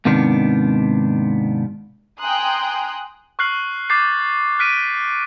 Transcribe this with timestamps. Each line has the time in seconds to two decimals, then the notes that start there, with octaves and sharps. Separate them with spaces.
0.05 D#2 G#2 C3 D#3 B3 D4
2.21 G5 G#5 A#5 C6 D#6 F#6
3.39 C#6 F6 F#6 C7 F#7
3.90 D6 G6 A6 C7
4.59 F6 F#6 B6 D7 D#7